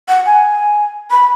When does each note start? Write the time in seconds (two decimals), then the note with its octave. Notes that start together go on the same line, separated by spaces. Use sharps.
0.09 F#5
0.26 G#5
1.11 B5